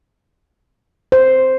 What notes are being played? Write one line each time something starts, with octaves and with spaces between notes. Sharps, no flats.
C5